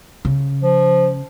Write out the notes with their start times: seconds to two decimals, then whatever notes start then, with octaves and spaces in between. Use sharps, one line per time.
0.25 C#3
0.63 F3